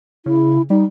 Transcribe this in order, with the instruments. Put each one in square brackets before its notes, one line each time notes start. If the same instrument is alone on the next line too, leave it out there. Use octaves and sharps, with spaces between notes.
[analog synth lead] C#3 [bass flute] E4
[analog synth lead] G3 [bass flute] D#4